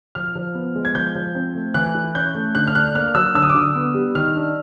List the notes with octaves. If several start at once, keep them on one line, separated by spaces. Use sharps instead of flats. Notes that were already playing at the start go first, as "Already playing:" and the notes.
F3 F6
F3
B3
G#3
G#6
F3 G6
F3
C4
A3
E3 F#6
E4
C#4 G6
A3
D3 F#6
F6
D4 F#6
A#3 F6
F#3 E6
D3 E6
D#6
D6
D3 D#6
B3
G3
D#3 F6
D4